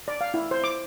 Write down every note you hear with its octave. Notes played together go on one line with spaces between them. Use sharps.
D5
F5
E4
C5
D6